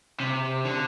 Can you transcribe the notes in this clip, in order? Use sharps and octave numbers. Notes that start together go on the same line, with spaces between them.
C3
D3